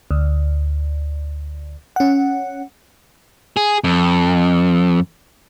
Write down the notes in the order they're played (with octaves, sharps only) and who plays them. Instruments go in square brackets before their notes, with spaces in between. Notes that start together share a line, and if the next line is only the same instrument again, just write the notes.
[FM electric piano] D2
C#4 F#5
[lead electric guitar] G#4
F2